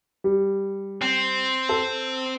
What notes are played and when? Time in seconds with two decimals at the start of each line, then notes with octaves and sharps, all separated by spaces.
0.24 G3
1.02 C4
1.69 A4